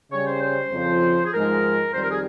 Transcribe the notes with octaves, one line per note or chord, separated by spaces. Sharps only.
C#3 G3 C#4 C#5
C5
C5
F2 C#3 F3
G#4
G#2 F3 G#3 D#4 A#4
F2 D#3 G3 C5
A#4
G#4